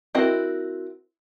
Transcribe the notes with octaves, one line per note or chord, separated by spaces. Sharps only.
C4 E4 F#4 A#4 D#5